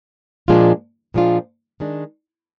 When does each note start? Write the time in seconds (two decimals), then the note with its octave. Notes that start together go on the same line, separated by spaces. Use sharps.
0.48 A#2 F3 G#3 D4 F4
1.14 A#2 F3 G#3 D4 F4
1.80 D#3 G#3 D4